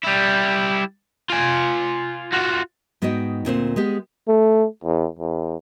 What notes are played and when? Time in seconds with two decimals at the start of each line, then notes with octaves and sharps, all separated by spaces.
0.03 G3 E4
1.30 F4 G#5
2.33 F4 F#4
3.02 G#2 B3 D#4 F#4 D#5 G5
3.45 D2 A#2 C4 C5
3.76 G#3 B3 G4
4.28 A3
4.84 E2
5.20 E2